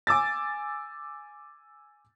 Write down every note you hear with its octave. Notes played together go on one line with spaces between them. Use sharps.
G#5 D6 E6 A6